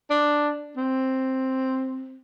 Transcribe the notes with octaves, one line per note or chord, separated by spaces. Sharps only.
D4
C4